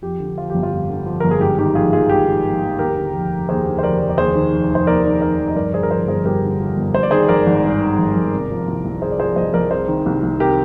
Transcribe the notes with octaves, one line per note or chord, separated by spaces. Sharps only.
F2 G4
D3
F3 F4
G1 G4
F4
F2
D3
F3
G1 A#4
G#4
G#2 G4
D#3 G4
A#1 F4 G#4
A#1 F4 G#4
G#2 G4
D#3
A#1
A#1
D#2 G4 A#4
D3
F1
F1
D#2 G#4 C5
D3
C5
F1 A#4 D5
F1
D5
D#2 G#4 C5
D#3
F1
F1 C5
D#2 A#4 D5
D#3
F1 A#4 D5
F1
D#5
G2 A#4 D5
D3 G#4 C5
A#4
F3 G#4 C5
G1 G#4 C5
G2 G4 A#4
D3
F3
G1
G2 C5
D5
D#3 G#4 C5
G#1 A#4 D5
G#1
G2
D#3
G#1
G#1
C3
F3
C2
C2
C3 G#4 C5
D5
F3 G#4 C5
C2 C5 D#5
C2 A#4 D5
C3 G#4 C5
D#3
C2
C2
C3 G4 A#4